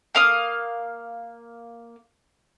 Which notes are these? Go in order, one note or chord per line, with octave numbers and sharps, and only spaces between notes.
A#3 F5 D#6